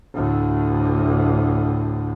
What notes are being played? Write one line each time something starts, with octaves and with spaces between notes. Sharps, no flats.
D2 A2